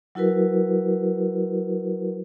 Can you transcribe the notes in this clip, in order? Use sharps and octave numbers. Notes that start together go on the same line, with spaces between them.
F#3 E4 F#4 A#4 B4